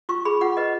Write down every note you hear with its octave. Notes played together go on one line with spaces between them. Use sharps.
F4 C#6
G#4 B5
F4 F#5
B4 D#5